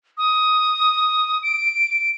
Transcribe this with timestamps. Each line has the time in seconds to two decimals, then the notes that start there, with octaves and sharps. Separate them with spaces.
0.18 D#6
1.43 D7